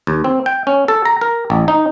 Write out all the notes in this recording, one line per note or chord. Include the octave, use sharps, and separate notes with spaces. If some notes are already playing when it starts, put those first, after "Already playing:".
D#2
C4
G5
C#4
A4
A#5
A#4
A1
D#4